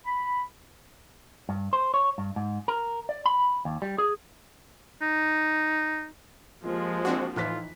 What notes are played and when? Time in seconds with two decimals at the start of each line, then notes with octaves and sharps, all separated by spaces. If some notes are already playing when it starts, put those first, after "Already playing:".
0.06 B5
1.49 G2
1.73 C5
1.94 C#5
2.18 G2
2.36 G#2
2.68 A#4
3.09 D5
3.26 B5
3.65 D#2
3.82 G3
3.98 G#4
5.02 D#4
6.65 F3 G#3 A#3 G4
7.05 C4 D4 F#4
7.36 A2 E3 D#4 F4 F#6 B6